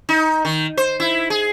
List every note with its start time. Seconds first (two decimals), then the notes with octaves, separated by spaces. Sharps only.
0.09 D#4
0.45 D#3
0.77 C5
1.00 E4
1.30 G#4